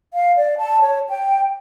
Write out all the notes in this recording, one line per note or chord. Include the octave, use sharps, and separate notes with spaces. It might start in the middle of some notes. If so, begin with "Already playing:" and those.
F5
D5
A5
C#5
G5